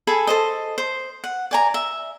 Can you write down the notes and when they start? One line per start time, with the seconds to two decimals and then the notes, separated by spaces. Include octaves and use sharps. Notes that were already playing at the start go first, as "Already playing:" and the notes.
0.07 G#4 A4 G#5 B5
0.27 A4 C5 D#5
0.78 C5
1.24 F#5
1.51 D5 G#5 A#5
1.74 E5